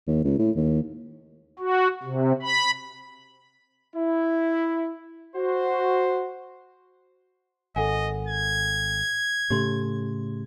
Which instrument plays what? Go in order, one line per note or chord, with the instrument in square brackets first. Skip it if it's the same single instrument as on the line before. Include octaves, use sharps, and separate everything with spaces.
[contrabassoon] D#2
C#2
A2
D#2
[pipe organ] F#4
C3
B5
[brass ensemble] E4
F#4 C5
[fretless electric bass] G#1 [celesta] A4 F#5 G#5 [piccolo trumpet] D#5
[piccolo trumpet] G#6
[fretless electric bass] A2 C#3 A3 [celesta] G4 C6